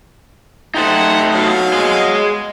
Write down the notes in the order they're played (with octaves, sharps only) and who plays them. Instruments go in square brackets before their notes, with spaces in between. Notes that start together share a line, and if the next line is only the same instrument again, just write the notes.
[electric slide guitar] A3 D#4 [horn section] G4 C5 F#5
[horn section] B2 F#3 F5
[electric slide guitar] G#4 D#5